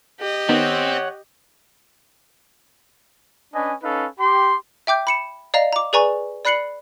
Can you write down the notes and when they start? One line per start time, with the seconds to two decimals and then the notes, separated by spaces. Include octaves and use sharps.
0.20 G4 D#5
0.49 D#3 B3 C4 C#5 F#5
3.54 C#4 D4 B4 D#5 G#5
3.83 C#4 D#4 A4 B4 F5
4.20 G4 C6
4.87 E5 G5 D6 G6
5.07 B5 C#7 E7
5.54 D5 D#5 F5 A#5 F7
5.72 A#5 D6
5.93 G#4 B4 D5 G#5 A#5 C#6
6.45 D5 B5 F#6 C7 C#7 F#7